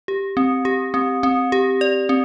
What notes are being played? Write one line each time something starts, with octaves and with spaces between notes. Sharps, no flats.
G4
C4
G4
C4
C4
G4
D5
C4